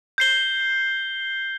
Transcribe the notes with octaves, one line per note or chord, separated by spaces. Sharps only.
G6 C7 G7